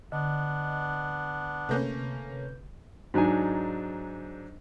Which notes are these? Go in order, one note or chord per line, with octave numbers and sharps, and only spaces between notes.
D3 B3 D4 D#5
C3 A3 A#3 C#4 B4 G6
G#2 F#3 D4 D#4 G#5